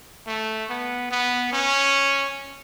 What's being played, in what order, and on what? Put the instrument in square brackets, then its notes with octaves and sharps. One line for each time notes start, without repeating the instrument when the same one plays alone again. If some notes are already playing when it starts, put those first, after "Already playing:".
[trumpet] A3
B3
B3
C#4